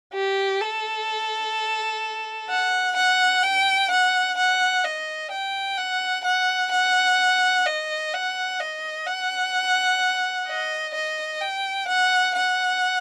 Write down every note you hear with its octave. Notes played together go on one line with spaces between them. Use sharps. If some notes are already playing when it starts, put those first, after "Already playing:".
G4
A4
F#5
F#5
G5
F#5
F#5
D#5
G5
F#5
F#5
F#5
D#5
F#5
D#5
F#5
D#5
D#5
G5
F#5
F#5